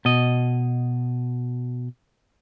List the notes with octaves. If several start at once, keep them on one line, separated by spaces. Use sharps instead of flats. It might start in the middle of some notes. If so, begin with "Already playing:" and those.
B2 D#5